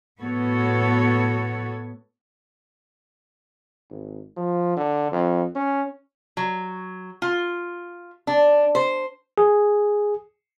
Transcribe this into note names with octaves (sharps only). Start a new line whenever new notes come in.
A2 A3 B3 F#4 A4 C#5
G#1
F3
D3
F2
C#4
F#3
F4
D4
C5
G#4